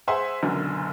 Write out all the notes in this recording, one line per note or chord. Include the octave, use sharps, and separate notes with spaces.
G#4 C5 E5 F#5 G#5 C6
F#1 B1 F#2 B2 D3